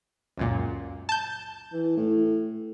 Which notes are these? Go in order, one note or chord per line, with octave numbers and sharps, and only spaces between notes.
C#2 F#2 A#2
A5 G6
E3
A2